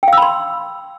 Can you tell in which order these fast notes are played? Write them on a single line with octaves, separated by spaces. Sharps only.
G5 F5 E6 B5 C6